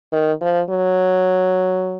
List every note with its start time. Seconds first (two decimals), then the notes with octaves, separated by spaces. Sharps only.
0.12 D#3
0.41 F3
0.70 F#3